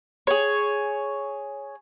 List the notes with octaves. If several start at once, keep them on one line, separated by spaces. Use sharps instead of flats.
G#4 C#5